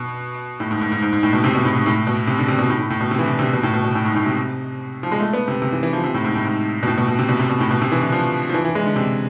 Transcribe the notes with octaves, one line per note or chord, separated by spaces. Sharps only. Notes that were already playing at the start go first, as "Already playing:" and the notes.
Already playing: B2
A2
G#2
G#2
G#2
G#2
G#2
A2
B2
C3
B2
A2
G#2
A2
B2
C3
D3
C3
B2
A2
A2
A2
B2
C3
E3
D3
C3
B2
A2
B2
B2
A2
G#2
A2
C3
F3
G#3
A3
B3
C3
C3
E3
E3
F3
C3
A2
G#2
A2
G#2
B2
A2
B2
B2
C3
B2
C3
B2
A2
B2
C3
E3
D3
F3
F3
E3
E3
G#3
D3
C3